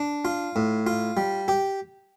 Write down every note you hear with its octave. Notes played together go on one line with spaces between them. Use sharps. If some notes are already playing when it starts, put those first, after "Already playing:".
Already playing: D4
F4
A2
F4
G3
G4